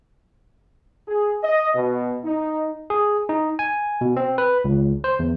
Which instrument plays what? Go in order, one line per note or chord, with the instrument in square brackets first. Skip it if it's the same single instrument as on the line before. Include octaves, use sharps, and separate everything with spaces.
[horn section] G#4
D#5
B2
D#4
[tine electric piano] G#4
D#4
G#5
B2
C4
B4
C#2
C5
E2